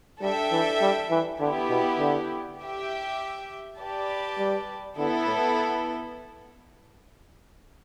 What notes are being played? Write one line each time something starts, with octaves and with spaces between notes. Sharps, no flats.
G3 D4 A4 E5 G5
E3
G3
E3
D3 B3 E4 G4
B2
D3
G4 E5 G5
G4 B4 D5 A5
G3
D3 B3 E4 A4
A2